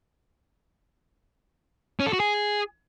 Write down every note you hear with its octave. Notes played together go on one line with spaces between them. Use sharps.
C#4
A4
F#4
G#4